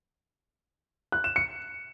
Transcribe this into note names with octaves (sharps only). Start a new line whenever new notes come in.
F#6
E7
C#7